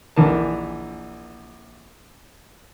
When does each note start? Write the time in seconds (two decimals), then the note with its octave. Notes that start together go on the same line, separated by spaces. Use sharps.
0.16 A#1 D#2 D3 E3 A#4 A5